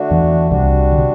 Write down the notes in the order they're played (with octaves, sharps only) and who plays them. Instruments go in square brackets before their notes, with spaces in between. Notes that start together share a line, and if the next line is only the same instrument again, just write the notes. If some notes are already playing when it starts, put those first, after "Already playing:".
Already playing: [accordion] D3 A3 D4 F#4
[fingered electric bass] E2 E3
[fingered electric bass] C2 C3 [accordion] G3 D4 F#4
[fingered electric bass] D3
C3